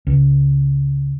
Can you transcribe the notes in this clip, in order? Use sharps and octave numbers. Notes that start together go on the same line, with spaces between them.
C#2